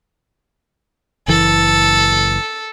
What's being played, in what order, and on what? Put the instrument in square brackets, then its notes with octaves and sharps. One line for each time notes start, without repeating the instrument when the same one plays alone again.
[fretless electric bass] F#1 E3 [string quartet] A4